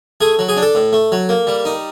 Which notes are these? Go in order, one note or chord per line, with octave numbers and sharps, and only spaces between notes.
A3 G#4
F#3
G#4
D4
A4
A2
A3
F#3
A#3
G3
D#4